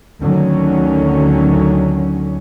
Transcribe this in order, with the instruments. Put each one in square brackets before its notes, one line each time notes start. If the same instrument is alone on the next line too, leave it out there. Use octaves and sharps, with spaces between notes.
[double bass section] D2 D3 D#3 F#3 C#4